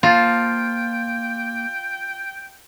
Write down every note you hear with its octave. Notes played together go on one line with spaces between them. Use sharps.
A#3 F4 C5 G5 A5